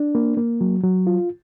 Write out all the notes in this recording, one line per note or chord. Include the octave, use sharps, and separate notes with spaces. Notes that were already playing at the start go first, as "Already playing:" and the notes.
Already playing: D4
A#3
A#3
F#3
F#3
F4